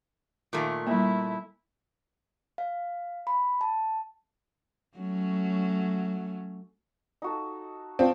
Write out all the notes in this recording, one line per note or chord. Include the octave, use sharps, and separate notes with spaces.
A#2 D#3 A3
G3 A#3 E4
F5
B5
A5
F#3 A3 C#4
D#4 F#4 A4
F3 C4